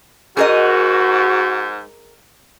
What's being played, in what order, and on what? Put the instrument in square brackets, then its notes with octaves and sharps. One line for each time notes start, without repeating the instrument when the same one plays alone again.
[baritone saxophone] G#2 [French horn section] F#4 [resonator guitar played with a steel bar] G#4 A#4 D#5